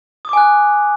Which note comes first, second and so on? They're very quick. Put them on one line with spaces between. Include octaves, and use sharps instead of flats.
D#6 D6 G#5 F#6